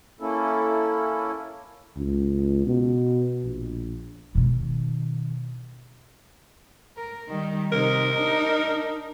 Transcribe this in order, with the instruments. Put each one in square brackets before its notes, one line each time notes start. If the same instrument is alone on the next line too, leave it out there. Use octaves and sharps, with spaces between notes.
[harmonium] A#3 C#4 E4 A4
[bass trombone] C#2
B2
A#1
[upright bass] B2 D#3
[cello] A#4
D#3 G3
[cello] C3 D#4 [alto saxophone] A#4
[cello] D4 D#4